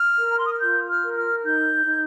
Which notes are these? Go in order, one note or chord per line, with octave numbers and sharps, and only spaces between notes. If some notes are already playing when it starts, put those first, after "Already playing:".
Already playing: F6
A#4
A#5
C6
D#6
F6
F4 G6
F6
A#4
F6
D#4 G6
D#4